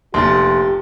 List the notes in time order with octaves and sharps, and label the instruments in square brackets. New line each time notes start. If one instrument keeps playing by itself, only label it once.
[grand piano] F1 A#1 [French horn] G4 [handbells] C6 A6